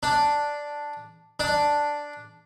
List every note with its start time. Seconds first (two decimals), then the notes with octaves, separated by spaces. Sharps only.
0.03 D4
1.40 D4